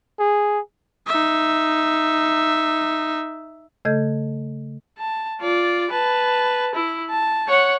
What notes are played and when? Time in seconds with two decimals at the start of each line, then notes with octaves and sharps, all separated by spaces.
0.19 G#4
1.07 D#4 E5
3.85 C#3 A3 A4 D#5 G6 G#6
4.99 A5
5.41 F4 D5
5.91 B4 A5
6.75 E4
7.10 A5
7.48 C#5 F#5